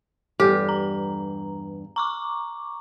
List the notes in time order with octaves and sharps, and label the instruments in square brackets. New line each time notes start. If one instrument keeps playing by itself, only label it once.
[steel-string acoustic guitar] E2 G2 [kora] G4 [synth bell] A4
[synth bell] A#5
A#5 C#6 D6